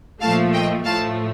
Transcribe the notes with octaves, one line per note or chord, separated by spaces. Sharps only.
A#2 F3 A3 F5 A5
D#5 G5
A2 F3 A3 F5 A5